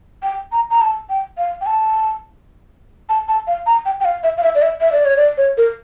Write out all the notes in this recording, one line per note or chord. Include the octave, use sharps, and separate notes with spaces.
G5
A#5
A#5
A5
G5
F5
G5
A5
A5
A5
F5
A#5
G5
G5
F5
E5
F5
E5
D5
E5
E5
D5
C#5
D5
C#5
A#4